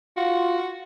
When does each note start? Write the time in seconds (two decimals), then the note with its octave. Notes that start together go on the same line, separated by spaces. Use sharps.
0.17 F4 F#4